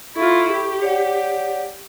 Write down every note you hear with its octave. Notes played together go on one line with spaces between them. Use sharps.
E4 F4 A4 C#6
G4
C#5 D5 F#5